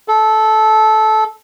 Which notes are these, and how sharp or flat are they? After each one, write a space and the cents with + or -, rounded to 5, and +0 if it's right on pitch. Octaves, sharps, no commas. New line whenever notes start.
A4 -15